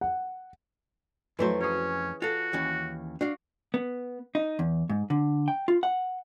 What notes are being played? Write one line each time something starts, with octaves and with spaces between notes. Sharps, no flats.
F#5
F2 E3 F#3 A3 C5
C#4 G#4 C#5
F4 F#4 A4
D#2 E3 C#4
D4 F#4 F5
B3
D#4
E2
G#2
D3
G5
F4
F#5